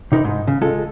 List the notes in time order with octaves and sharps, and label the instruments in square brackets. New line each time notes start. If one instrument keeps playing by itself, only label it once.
[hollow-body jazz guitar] C3 D#4 A#4 B5
G#2
C#3
G#3 F4 A4